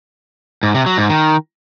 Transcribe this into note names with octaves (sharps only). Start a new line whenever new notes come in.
G#2
C3
F#3
G#2
D#3